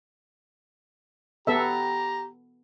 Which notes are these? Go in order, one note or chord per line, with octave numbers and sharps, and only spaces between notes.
B3 G4 A4 E5 A#5